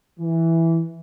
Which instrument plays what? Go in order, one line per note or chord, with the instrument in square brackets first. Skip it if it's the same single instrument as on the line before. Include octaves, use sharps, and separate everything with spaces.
[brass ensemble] E3